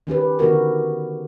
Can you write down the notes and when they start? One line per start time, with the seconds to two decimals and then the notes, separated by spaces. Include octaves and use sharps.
0.07 D#3 C#4 G4 B4
0.39 D3 D#3 B3 F#4 A#4